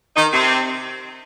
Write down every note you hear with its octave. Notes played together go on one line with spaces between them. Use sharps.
D#3 D#4
C3 C4